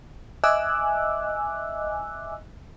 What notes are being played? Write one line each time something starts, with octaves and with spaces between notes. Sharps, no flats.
D#5 E5 G#5 D6 E6 F#6